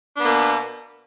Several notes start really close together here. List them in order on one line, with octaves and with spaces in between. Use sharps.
D4 B3 A#3 B2